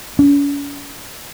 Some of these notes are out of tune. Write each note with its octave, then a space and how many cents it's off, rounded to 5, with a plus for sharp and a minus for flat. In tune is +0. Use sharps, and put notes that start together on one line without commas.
C#4 +45